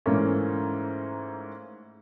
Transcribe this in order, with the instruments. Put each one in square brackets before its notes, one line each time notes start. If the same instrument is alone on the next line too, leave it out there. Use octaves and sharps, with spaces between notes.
[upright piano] G#2 E3 A3 A#3 C#4